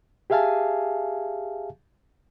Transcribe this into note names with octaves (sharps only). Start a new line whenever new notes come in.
G4 G#4 E5 F5 G#5 A5